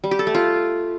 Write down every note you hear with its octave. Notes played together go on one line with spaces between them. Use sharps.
G3
G4
A4
A3
F4